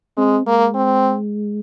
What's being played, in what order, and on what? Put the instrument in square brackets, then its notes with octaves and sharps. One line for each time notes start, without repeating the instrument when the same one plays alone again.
[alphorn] G#3 [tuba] C4
[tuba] G#3 [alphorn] A#3
[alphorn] C4